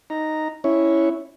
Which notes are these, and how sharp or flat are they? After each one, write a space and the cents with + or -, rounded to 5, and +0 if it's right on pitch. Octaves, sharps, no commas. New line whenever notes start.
D#4 +0 A#5 +0
C#4 +0 E4 +0 C#5 +0